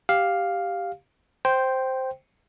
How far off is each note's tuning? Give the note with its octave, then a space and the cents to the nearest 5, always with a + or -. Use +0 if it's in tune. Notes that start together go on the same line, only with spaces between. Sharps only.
G4 +0 F5 +5
C5 +0 G5 -10